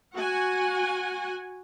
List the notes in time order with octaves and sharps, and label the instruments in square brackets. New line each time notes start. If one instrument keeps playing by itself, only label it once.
[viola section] F#4 F#5 G#5